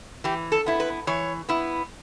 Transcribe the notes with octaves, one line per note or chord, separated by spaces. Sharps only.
E3 G4
A4
B3 E4
B4
E3 C#5
B3 E4